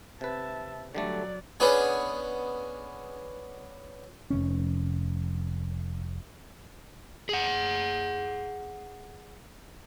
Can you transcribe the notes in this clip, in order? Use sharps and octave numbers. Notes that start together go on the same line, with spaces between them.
C3 B4 E5 A5
D3 F#3 G3 A3 D5
B3 C#4 D4 G#4
F1 C#4
G#4 F#5